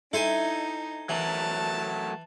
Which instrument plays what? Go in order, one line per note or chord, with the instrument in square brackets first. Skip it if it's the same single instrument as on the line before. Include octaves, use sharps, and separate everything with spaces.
[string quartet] D#4 [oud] E4 [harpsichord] A4 C5 G#5
[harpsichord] E3 [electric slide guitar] F#3 A3 A#4 [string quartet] A5